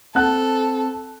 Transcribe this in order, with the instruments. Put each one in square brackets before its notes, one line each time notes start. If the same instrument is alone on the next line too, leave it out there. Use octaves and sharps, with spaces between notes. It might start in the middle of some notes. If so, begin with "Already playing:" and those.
[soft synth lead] C4 [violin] A4 [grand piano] F#5 A5 F#6